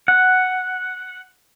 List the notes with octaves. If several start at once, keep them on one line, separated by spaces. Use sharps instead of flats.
F#5